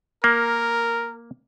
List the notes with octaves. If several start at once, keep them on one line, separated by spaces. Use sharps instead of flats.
A#3 A#4